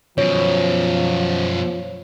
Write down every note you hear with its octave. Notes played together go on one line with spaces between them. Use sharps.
F#2 B2 F3 C#5